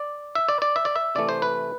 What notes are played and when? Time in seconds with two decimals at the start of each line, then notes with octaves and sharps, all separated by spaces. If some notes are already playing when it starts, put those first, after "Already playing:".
Already playing: D5
0.35 E5
0.48 D5
0.62 D5
0.76 E5
0.85 D5
0.96 E5
1.15 C3 E3 A3 D5
1.29 C5
1.42 B4